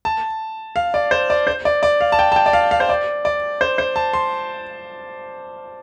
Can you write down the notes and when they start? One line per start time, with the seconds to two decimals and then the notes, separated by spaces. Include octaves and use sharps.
0.05 A5
0.76 F5
0.94 D5
1.11 C5
1.30 D5
1.47 C5
1.65 D5
1.83 D5
2.01 F5
2.12 A5
2.19 G5
2.32 A5
2.36 G5
2.46 D5
2.53 F5
2.71 F5
2.80 C5
2.89 D5
3.25 D5
3.61 C5
3.78 C5
3.96 A5
4.13 C6